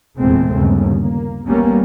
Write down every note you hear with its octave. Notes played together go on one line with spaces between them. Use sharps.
F1 E2 A#2 G#3 A3 C4
G1 D#2 C#3
A#3
A1 G3 A#3 B3 C#4